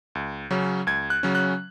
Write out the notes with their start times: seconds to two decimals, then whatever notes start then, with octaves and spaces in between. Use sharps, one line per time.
0.15 C#2
0.51 C#3 F#3 C#4
0.87 C#2 G#6
1.10 F#6
1.23 C#3 F#3 C#4
1.35 F#6